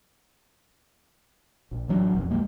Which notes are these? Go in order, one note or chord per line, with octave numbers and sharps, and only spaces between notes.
A#1
A1 E3 F#3 D4
D#1 B1 F2
A#1 E2 G#3 A#3